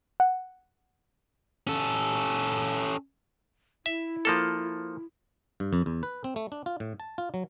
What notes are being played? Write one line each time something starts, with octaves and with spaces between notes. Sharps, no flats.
F#5
C#4 A4
E4 E5
F3 A#3 A4
G2
F2
E2
B4
C4
A3
D4
F4
A2
A5
F4
F#3